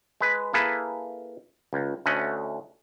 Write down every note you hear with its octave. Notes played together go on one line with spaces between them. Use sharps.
G#3 B4
A#3 E4 G#4 A4 B4
C#2
D2 A3 C#4 D#5 F#5